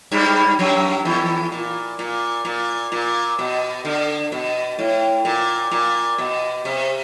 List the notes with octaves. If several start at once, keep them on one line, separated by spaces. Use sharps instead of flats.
G2 G3
F#2 F#3
E2 E3
A#2
A#2
A#2
A#2
B2
D3
B2
A2
A#2
A#2
B2
C3